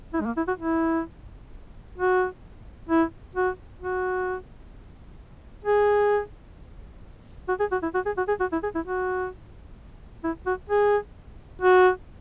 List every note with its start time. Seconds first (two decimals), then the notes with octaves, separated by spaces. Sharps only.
0.13 E4
0.21 G#3
0.26 A#3
0.37 E4
0.48 F#4
0.59 E4
1.98 F#4
2.89 E4
3.35 F#4
3.80 F#4
5.64 G#4
7.48 F#4
7.60 G#4
7.72 F#4
7.83 E4
7.94 F#4
8.06 G#4
8.17 F#4
8.28 G#4
8.40 F#4
8.52 E4
8.63 G#4
8.75 E4
8.86 F#4
10.24 E4
10.46 F#4
10.69 G#4
11.61 F#4